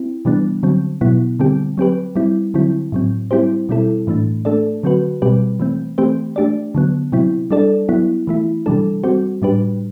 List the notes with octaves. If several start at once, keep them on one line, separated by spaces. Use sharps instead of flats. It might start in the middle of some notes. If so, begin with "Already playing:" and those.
Already playing: C4 E4
C3 E3 G3 B3 D4
D3 F#3 C4
B2 F#3 B3 E4
D3 G3 C4 G4
F#3 C4 G4 B4
G3 C4 E4
D3 F#3 C4 E4
A2 F#3 C4
G3 C4 E4 G4 C5
B2 G3 C4 E4 A4
A2 E3 A3 D4
A3 D4 A4 D5
D3 F#3 C4 F#4 B4
B2 G3 C4 G4 B4
E3 A3 C4
E3 A3 C4 G4 C5
A3 D4 G4 D5
D3 F#3 B3
C3 F#3 C4 E4
G3 D4 A4 D5
F#3 B3 E4
E3 A3 E4
C3 E3 G3 D4 A4
G3 C4 F#4 C5
A2 G3 D4 G4 B4